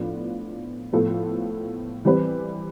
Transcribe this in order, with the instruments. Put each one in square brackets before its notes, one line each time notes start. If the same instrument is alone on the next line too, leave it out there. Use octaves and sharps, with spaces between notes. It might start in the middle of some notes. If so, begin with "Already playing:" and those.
Already playing: [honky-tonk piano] A2 F3 B3 D4 F4
A2 F3 B3 F4 A4
E3 G3 C4 G4 B4